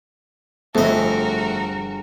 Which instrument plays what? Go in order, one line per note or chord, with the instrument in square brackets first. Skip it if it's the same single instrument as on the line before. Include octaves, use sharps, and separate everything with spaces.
[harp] G1 G#4 [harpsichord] F2 D#5 [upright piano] A3 [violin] F#4 A#4